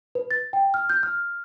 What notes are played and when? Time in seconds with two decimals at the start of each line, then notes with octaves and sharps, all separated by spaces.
0.15 B4
0.31 A6
0.53 G5
0.74 F6
0.89 G6
1.03 F6